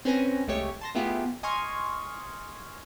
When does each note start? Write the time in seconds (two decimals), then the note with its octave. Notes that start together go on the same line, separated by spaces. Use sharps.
0.05 C4 C#4 B4 G#5 A#6
0.47 C2 G#3 A3 G4 C#5 C#6
0.81 A5 C6 A#6
0.95 A3 B3 E4 F4 G4 G#4
1.43 D#5 G#5 C6 C#6 F6 G#6